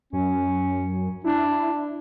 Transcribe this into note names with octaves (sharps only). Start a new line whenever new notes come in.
F#2 C#4
D4 E4